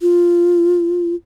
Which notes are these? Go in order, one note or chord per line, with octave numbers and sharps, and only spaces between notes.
F4